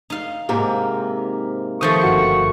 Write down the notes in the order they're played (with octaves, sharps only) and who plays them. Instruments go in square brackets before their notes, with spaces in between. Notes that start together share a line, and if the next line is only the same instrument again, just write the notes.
[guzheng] D#4 F5
[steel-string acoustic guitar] G#2 C3 A#3
[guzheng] D#3 F3 A3 [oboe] C#6 [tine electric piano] D#6 G6 A6
[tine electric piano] G1 F#4 C#7